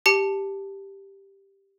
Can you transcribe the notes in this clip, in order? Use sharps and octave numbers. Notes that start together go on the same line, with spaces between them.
G4 A5 C#7